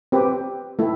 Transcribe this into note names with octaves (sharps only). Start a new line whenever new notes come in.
C4 G4 B4
A3 E4